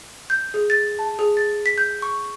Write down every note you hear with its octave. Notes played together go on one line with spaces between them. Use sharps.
G6
G#4
A6
A5
G#4
A6
B6
G6
C#6